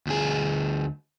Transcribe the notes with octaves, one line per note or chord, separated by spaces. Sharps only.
D2 G#4